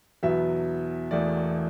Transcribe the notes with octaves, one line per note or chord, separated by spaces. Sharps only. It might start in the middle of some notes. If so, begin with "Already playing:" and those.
E2 B2 F#3 B3 E5
E1 E2 B2 A3 D5